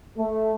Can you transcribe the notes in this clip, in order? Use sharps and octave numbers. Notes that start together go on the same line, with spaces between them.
A3